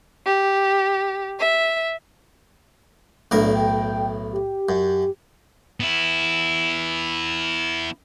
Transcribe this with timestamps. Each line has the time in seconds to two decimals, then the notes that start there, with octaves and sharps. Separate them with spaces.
0.24 G4
1.39 E5
3.31 B1 A2 D4 A#4
3.54 G5
4.32 G4
4.69 F#2
5.80 B3 E4